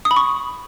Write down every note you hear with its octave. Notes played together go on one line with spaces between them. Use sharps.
D#6
B5
C#6